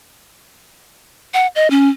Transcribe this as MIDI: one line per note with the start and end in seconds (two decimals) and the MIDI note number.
1.34 1.47 78
1.55 1.70 75
1.70 1.89 61